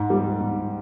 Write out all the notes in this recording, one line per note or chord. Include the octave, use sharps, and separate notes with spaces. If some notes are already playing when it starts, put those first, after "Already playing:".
Already playing: G#2
G3
G#2